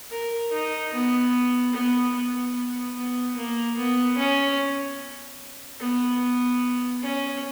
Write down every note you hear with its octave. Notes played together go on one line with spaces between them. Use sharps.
A#4
D#4
B3
B3
B3
B3
B3
A#3
B3
C#4
B3
C#4